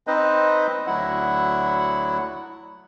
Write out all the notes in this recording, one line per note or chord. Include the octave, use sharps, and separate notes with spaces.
C4 D#4 B4 C5 D#5
D2 F#3 E4 F#5